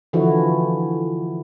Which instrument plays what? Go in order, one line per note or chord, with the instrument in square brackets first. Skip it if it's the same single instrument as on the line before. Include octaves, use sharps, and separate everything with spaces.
[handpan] D3 E3 F3 E4 F#4